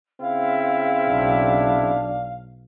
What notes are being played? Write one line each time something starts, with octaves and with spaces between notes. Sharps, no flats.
C#3 C4 E4 F5
B1 D4